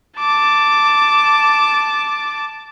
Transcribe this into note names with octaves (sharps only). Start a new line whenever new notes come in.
A5 D6